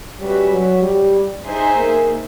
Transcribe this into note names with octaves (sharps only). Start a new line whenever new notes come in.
G3 C#4 F#4 B4 E5
F#3
G3
D#4 G#4 C5 E5 G#5
A#3